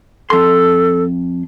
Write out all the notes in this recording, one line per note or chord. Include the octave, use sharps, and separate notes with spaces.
F2 A4 C6